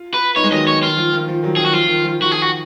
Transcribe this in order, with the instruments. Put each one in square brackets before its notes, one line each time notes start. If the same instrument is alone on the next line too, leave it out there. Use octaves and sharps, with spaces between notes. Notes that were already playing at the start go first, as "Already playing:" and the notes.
Already playing: [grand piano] F4
[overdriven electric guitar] B4
[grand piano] B3 D#4 [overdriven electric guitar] C#5
[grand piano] G#3
[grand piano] D#3 F#3 [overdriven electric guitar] D#5
[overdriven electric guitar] C#5
[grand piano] D#3 [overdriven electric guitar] F4
[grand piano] F3
D#3
F3
D#3 F#3
[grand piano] D#3 [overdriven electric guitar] G#4
[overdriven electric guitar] F#4
[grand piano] F3 [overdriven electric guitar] F4
[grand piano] D#3
F3
[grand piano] D#3 [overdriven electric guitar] F#4
[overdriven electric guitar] G#4
F#4